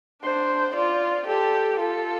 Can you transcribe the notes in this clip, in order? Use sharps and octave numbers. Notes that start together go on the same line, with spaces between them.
D4 C5
F4 D5
G4 A4
F4 A4